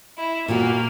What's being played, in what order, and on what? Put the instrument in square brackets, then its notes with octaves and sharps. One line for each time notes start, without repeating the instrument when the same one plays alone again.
[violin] E4
[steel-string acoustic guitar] A#2 G3 B3 F#4 [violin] A#3